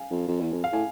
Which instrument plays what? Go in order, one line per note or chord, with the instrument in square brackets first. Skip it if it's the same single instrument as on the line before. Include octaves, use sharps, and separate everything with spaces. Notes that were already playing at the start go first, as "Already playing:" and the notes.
Already playing: [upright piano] F5 G#5
[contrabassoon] F2
F2
E2
F2
[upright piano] F5
[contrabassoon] A2 [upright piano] G#5